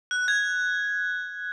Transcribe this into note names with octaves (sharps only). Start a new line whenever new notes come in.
F#6
G#6